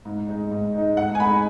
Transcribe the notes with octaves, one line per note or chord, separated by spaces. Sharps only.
G#2
G#3 D#4
G#2
G#3 D#4
G#2 F#5
G#5
G#3 D#4 B5